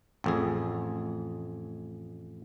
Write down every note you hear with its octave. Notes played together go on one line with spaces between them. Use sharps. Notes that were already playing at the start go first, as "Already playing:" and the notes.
A1 F2 G#4